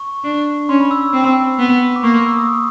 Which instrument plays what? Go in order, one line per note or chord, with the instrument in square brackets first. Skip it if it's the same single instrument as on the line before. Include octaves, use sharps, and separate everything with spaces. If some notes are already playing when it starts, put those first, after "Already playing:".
Already playing: [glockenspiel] C#6
[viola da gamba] D4
[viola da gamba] C#4 [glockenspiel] C6
[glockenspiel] B5
E6
[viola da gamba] C4
B3
[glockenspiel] D6
[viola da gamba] A#3 [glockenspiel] C#6
[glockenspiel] C6
E6
D#6